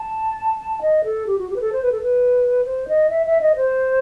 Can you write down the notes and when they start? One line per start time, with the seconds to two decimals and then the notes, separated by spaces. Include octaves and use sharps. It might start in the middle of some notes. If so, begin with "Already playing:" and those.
Already playing: A5
0.81 D#5
1.04 A4
1.27 G4
1.38 F#4
1.50 G4
1.56 B4
1.61 A4
1.72 C5
1.83 B4
1.92 A4
2.02 B4
2.65 C5
2.88 D#5
3.10 E5
3.26 E5
3.41 D#5
3.56 C5